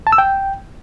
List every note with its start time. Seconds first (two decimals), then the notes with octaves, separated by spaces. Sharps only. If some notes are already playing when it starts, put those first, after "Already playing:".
0.07 A5
0.12 E6
0.18 G5